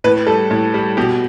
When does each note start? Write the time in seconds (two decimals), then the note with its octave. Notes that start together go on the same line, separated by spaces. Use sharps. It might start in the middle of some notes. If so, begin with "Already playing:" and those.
0.04 A2 B4
0.27 G3 A4
0.51 A2
0.74 G3
0.97 B2 G4